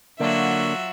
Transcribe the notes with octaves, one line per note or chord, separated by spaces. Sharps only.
D3 F#3 A#3 D4 F4 F#4 E5